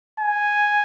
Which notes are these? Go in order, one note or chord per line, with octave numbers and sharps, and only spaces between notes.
G#5